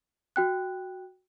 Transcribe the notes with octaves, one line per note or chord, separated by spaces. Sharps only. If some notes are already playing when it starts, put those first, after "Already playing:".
F#4 G5 F#6